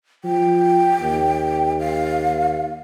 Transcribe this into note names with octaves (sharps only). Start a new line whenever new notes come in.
F3 G5
D#2
F5